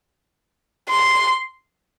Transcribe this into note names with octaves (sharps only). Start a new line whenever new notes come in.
C6